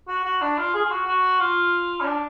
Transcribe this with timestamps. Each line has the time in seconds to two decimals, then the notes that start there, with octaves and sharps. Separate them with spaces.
0.08 F#4
0.25 F#4
0.41 D4
0.58 F4
0.74 G#4
0.85 F4
0.90 F#4
1.07 F#4
1.40 F4
2.01 C#4
2.06 D4